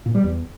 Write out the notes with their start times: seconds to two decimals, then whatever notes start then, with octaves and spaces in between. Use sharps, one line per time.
0.06 A#2
0.15 G3
0.24 E2